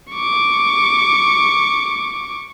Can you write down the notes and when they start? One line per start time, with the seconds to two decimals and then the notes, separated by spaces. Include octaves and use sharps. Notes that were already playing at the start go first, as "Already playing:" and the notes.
0.13 C#6 D6